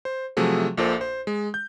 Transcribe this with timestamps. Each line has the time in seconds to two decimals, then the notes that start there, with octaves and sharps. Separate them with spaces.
0.05 C5
0.37 C3 F3 F#3 A3 G#4
0.77 A#1 A#2 A4 C5
1.01 C5
1.27 G#3
1.54 G6